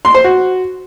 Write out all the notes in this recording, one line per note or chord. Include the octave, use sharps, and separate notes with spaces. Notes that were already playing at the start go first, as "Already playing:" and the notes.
C6
C5
F#4